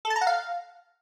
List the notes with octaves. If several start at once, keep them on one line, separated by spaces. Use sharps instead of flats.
A4
A5
A#5
F#5
F5